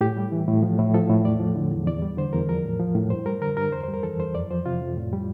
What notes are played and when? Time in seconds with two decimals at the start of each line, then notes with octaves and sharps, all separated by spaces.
0.01 A2 G4
0.17 G3
0.32 E3
0.48 A2
0.63 F3
0.79 A2
0.94 F3 A4
1.10 A2
1.25 E2 D5
1.40 F3
1.56 D3
1.71 E2
1.87 E2 D5
2.02 G3
2.17 D3 C5
2.33 E2 A#4
2.49 F3 A#4
2.65 A2
2.79 F3
2.95 A2
3.10 G2 C5
3.26 G3 A#4
3.41 D3 A#4
3.57 G2 A#4
3.72 E2 C5
3.83 C5
3.88 G3
3.94 A#4
4.03 E3 A4
4.19 E2 C5
4.35 F2 D5
4.51 F3 C5
4.66 C3 F4
4.81 F2
4.97 A2
5.13 G3